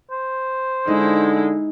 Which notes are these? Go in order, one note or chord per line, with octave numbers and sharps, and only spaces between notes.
C5
D3 G#3 D#4 E4